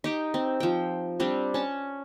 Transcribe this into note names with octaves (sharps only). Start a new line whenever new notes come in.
D#4 G4 G5
C4
F3 G5
G3 C4 D4
C#4 A5